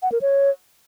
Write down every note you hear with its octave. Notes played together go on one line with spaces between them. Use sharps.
F#5
A#4
C#5